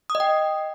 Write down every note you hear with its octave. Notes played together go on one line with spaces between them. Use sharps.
D#6
D#5
G5